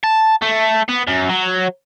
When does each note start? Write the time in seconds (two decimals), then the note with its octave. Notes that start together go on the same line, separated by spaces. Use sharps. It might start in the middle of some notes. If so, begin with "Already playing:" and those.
0.03 A5
0.42 A3
0.89 B3
1.07 F#2
1.29 F#3